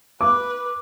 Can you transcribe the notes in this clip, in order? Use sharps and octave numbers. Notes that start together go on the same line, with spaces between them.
B4 D6